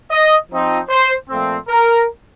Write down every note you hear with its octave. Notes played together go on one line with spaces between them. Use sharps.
D#5
F3 C4 D#4
C5
A#2 F3 A3 C4
A#4